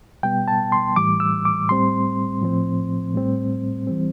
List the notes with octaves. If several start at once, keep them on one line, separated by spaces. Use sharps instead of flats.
B2 G3 B3 G5
A5
C6
A2 E3 G3 D6
E6
D6
A2 G3 C4 C6
A2 F3 C4
A2 G3 C4
E3 G3 C4